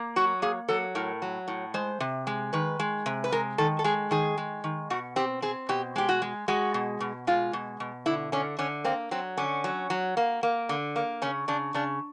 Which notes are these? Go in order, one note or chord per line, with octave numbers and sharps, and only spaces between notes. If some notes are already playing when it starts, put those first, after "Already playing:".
Already playing: A#3
F#3 F#4
A#3 G#4
F#3 A4
A2 A#4
F#3
A2
G#3 C5
C3
G#3
D#3 B4
G#3
C3
B4
G#3 A#4
D#3 A4
A4
G#3 G#4
D#3 G#4
G#3
D#3
B2 F#4
C4 G4
C4 G#4
B2 G4
G#3 G4
F#4
G#3
G#3 F#4
B2
B2
G#3 F4
B2
B2
D3 E4
D3 C#4
D3 C#4
A#3 C4
F#3 C4
D3 C#4
F#3
F#3
A#3
A#3
D3
A#3
C#3 C#4
C#3 D4
C#3 D4